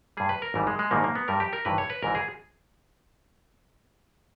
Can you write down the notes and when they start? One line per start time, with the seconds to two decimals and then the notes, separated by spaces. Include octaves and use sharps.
0.17 G2 G3 G#4
0.29 B4
0.42 A#4
0.54 G#1 G#2 E3 G3
0.67 G#3
0.79 G#3
0.91 A#1 G#2 D#3 G3 A#3
1.04 A#3
1.15 B3
1.28 G2 G3 A#4
1.40 G4
1.53 A#4
1.65 G#1 G2 E3 B4
1.78 C#5
1.90 B4
2.03 G#1 G#2 E3 A#4
2.15 G#4